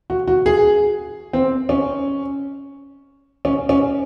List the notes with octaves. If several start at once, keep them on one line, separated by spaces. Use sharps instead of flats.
F#4
F#4
G#4
C4
C#4
C#4
C#4